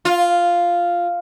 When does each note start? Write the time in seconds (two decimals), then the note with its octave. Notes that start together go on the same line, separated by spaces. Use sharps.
0.05 F4